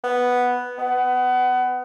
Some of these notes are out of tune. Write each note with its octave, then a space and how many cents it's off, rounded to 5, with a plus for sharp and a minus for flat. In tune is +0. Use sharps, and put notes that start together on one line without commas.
B3 +0
B3 +25